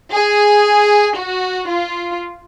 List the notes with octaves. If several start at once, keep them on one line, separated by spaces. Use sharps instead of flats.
G#4
F#4
F4